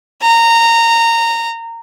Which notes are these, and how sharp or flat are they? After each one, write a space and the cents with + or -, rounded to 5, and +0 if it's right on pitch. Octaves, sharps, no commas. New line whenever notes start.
A#5 -15